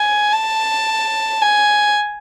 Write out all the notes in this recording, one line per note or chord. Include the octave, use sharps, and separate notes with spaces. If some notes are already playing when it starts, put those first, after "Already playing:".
Already playing: G#5
A5
G#5